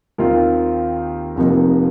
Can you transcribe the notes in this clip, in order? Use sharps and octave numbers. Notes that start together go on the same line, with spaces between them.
D#2 D#3 C4 F4
F1 F2 F3 A#3 D#4